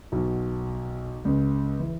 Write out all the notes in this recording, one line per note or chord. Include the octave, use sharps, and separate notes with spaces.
B1 B2
C#2 C#3
E3